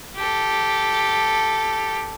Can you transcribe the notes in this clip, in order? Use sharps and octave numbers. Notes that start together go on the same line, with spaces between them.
G4 A4